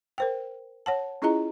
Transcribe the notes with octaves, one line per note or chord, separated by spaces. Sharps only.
A#4 C5 G5
C#5 F#5 A5
C#4 E4 F4 G#4 D#5 A#5